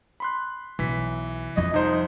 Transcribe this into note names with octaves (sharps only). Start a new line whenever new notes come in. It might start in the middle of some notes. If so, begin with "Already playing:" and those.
B5 C6 F#6
B1 E3 B6
F2 F3 D#5
C2 D#4 C5